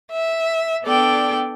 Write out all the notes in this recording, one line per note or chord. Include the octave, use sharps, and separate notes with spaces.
E5
B3 D4 A4 D5 G5